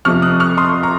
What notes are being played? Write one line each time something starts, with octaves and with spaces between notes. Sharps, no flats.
F2 C3 F3 C#6 F6
D#6 F#6
C#6 F6
C6 D#6
A#5 C#6